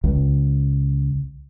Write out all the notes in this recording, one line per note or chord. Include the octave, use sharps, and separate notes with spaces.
C#2